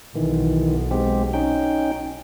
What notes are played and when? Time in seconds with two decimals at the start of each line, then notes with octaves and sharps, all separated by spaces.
0.15 B1 D#3 E3
0.91 G#3 C4 G4
1.34 C#4 D#4 G5